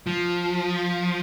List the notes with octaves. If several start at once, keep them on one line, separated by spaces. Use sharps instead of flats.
F3